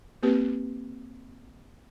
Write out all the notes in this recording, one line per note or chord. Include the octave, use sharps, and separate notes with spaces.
A#3 C4 G4 B4